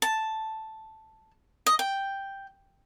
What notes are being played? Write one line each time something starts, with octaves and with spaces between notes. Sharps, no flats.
A5
D#5
G5